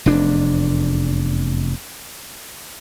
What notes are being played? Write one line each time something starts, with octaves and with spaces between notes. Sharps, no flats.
F1 E2 D4